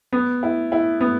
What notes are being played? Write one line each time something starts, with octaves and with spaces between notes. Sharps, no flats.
B3
E4
E4
B3